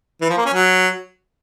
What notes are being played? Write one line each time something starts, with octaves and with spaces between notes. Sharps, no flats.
E3
F3
A#3
C#4
F#3